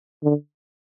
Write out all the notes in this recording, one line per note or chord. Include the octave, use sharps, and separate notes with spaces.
D3